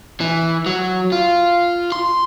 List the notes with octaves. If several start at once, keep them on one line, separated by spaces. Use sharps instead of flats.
E3
F#3
F4
C6